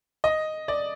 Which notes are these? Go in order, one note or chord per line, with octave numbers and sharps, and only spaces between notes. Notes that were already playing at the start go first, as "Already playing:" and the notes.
D#5
D5